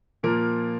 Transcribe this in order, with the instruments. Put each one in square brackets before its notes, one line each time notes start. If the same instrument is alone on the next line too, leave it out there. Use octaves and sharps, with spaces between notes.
[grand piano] A#2 F3 A#3 A#4